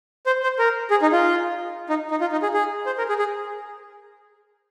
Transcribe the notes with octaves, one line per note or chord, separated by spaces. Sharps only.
C5
C5
A#4
G#4
D#4
F4
D#4
D#4
F4
D#4
G#4
G#4
C5
A#4
G#4
G#4